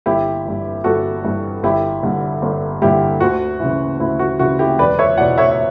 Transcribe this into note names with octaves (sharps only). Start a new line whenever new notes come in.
G1 E4 G4
G2 E3
G1 F#4 A4
G2 E3
G1 E4 G4
G2 D3
G1
G2 D3 E4 G4
D2 F#4
C#3 E3
D2 E4
F#4
C#3 E3 F#4
E4 G4
E1 B4 D5
C#5 E5
E2 B2 D5 F#5
C#5 E5
E5